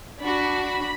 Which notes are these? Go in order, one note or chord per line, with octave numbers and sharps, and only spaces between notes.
D4 F#4 B5